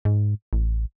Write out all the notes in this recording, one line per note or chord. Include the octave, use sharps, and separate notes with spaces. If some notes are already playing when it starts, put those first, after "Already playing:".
G#2
A1